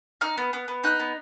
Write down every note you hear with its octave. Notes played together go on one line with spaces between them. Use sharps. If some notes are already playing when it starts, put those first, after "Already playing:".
D#4 F6
B3
B3
B3
D#4 F#6
B3